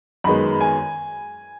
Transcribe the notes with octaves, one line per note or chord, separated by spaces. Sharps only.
F#2 D#3 G#3 B3 B5
G#5